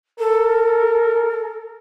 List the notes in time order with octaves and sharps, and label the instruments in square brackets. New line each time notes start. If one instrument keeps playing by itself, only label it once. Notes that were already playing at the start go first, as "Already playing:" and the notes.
[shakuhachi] A4 [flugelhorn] A#4